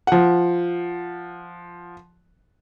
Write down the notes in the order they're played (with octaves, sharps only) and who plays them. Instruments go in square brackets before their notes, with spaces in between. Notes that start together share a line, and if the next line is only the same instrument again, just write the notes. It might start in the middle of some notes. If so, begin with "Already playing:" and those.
[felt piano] F3 F#5